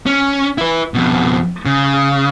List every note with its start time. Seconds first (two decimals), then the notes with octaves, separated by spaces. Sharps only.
0.06 C#4
0.58 E4 B4
0.94 F2 B2
1.66 C#3